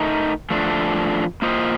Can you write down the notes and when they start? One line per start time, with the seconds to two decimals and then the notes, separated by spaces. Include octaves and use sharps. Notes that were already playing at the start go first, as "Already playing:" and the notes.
Already playing: A3 D#4 A#4
0.50 F3 A3 D4
1.42 A#3 F4 C5 D#5